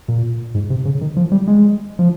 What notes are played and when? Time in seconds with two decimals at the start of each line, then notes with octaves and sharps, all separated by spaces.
0.08 A#2
0.55 G#2
0.70 C3
0.85 C#3
1.01 D#3
1.17 F3
1.32 G3
1.48 G#3
1.99 F3